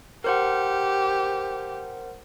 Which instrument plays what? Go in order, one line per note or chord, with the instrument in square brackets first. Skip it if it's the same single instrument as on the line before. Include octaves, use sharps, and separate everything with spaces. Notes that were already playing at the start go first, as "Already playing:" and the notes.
[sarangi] G4 [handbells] A#4 C5 F#5